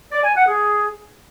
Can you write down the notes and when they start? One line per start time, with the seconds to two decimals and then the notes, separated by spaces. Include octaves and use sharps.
0.12 D5
0.24 G#5
0.35 F#5
0.47 G#4